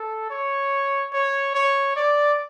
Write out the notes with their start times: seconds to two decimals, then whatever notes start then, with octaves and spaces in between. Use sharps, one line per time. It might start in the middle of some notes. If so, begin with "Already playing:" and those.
Already playing: A4
0.30 C#5
1.13 C#5
1.55 C#5
1.96 D5